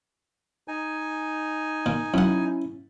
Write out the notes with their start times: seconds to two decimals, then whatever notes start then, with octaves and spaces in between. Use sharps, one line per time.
0.68 D#4 G#5
1.86 A#2
2.14 F#2 C#4 E4 F#5